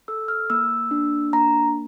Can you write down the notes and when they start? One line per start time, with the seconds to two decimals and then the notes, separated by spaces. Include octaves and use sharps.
0.08 A4 E6
0.28 F6
0.50 A#3 E6
0.91 D4
1.33 A#3 A#5